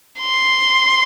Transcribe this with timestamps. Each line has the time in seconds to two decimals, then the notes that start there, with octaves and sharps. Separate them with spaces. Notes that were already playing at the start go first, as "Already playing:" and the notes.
0.20 C6